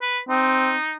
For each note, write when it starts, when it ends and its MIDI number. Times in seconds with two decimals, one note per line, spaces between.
0.02 0.19 71
0.29 0.74 60
0.29 0.96 63